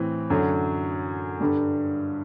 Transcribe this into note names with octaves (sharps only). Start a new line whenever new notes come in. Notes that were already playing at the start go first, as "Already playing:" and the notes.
Already playing: A2 E3 C4
F#2 D3 F#3
G2 D3 G3